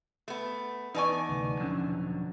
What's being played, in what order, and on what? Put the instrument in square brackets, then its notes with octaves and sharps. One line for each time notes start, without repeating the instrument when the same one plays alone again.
[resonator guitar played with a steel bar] A3 B3
[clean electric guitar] E2 B3 [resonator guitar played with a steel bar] D#4 D5 G#5 [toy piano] B4 A5 C#6
[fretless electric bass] D2 C3
[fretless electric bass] E1 C#4 [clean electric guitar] D3 F3 F#3